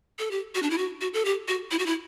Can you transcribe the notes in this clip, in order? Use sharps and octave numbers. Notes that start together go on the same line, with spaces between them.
A4
G4
F#4
D4
E4
F#4
F#4
A4
G4
F#4
E4
F#4
E4